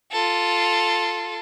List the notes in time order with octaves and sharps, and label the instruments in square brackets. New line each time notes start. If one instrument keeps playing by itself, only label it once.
[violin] F4 A4